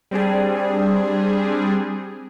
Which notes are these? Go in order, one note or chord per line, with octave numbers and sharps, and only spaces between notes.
G3 C4 D4 G#4